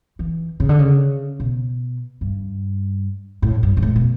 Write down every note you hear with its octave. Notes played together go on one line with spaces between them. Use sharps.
E3
C#3
D3
C#3
B2
G2
A2
G2
G2
A2
B2